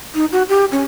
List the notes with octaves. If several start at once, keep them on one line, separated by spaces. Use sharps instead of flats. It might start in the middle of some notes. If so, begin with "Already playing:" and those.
D#4
F#4
G4
C#4